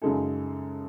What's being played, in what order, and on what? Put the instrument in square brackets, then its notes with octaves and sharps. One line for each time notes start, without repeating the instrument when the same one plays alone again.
[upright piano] F#2 C#3 G#3 D#4 A4